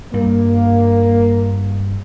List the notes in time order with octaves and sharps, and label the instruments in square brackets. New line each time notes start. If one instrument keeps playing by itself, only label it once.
[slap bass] G2 G3 [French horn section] A#3